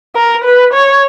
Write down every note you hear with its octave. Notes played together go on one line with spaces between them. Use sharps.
A#4
B4
C#5